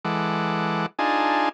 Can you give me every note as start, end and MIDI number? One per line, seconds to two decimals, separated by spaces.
0.05 0.86 52
0.05 0.86 56
0.05 0.86 69
0.05 0.86 78
0.05 0.86 86
0.99 1.49 62
0.99 1.49 63
0.99 1.49 65
0.99 1.49 68
0.99 1.49 80
0.99 1.49 81